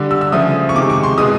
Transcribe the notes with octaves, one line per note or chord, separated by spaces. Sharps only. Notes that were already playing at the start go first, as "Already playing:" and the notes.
Already playing: D3 G3
E6
E6
C#3 F3 A3 D#6
C#6
C3 D#3 G#3 D6
C#6
C6
B2 G#3 D#6